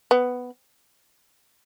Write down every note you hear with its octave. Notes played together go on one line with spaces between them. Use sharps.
B3